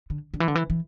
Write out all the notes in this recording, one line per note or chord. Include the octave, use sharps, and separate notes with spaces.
D3
D3
E3
D3
E3
E3